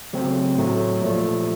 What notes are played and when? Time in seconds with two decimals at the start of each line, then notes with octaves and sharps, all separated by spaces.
0.13 C#3 F#3 A3 C4
0.57 A2 F#3 A3
1.01 A#2 F3 A3